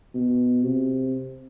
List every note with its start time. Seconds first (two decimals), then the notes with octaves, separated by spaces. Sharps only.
0.14 B2
0.63 C3